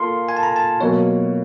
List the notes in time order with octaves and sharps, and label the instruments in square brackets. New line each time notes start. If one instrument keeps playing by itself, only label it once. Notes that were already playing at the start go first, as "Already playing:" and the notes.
Already playing: [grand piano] A#3 F4 A4 [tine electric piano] C6
[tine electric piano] G#5
A5
A#5
A5
[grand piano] B2 F#3 A#3 [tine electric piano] C#5